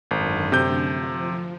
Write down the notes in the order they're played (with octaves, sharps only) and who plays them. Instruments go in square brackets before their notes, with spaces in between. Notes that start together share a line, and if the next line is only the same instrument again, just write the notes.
[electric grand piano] G#1 [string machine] F#2 D3 A3
[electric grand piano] C3 G6
[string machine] F3